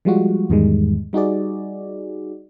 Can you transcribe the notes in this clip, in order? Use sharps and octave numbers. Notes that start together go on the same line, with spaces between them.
F3 G3 G#3 F4 F#4
E2 G#2 D#3 G3 G#3
G3 D#4 F#4 G#4 D5